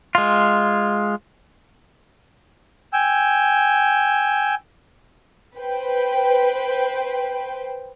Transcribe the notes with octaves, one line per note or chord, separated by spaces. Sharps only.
G#3 F4
G5 G#5 E6
B4 C5 G5